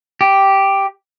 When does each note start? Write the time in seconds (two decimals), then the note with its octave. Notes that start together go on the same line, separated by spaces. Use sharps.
0.21 G4